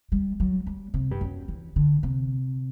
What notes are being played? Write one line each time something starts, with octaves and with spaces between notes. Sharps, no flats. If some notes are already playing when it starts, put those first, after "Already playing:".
G3
F#3
G3
C3
G2
F#2
E3
D3
C3